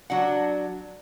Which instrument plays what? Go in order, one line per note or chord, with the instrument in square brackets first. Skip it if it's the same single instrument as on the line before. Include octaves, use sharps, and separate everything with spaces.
[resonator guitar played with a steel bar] F#3 D4 F#5